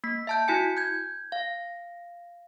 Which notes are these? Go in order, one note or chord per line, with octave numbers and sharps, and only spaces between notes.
A#3 B6
E5 A5 G6
E4 F#4 G#5 C#7
G6 G#6
F5